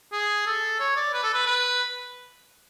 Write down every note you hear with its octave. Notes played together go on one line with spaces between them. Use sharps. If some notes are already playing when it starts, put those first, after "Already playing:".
G#4
A4
C#5
D5
B4
A4
B4
B4